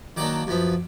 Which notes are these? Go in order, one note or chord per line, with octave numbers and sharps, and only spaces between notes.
D#3 F#3 A#3 D4 D6
F#2 F3 B3